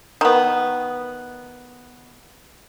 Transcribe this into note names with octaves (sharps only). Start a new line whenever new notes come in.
D#3 B3